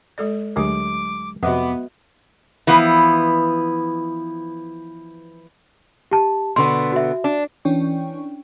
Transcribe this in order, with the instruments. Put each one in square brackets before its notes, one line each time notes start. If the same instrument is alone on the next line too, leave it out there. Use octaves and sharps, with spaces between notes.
[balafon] G#3 A4 D5
[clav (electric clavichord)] D2 G#4 A#4 [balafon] F#3 G#3 G4 [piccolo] D6
[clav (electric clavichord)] F2 C3 [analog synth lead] B3 [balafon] F#4 D#5 E5 [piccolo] D6
[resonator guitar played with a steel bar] E3 F3 B3
[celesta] G4 A5
[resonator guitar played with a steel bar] B2 D3 B3 [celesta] C6
[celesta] F#4 E5
[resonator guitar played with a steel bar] D4
[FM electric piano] E3 C#4 D4 G5 C#6